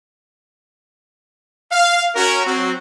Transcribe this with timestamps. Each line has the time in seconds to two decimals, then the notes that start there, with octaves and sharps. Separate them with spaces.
1.72 F5
2.15 C#4 F#4 A#4
2.45 F#3 C4 F#4